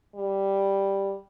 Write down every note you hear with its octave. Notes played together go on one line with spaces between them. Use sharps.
G3